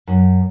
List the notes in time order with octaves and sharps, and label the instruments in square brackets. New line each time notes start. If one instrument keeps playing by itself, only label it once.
[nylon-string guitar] F#2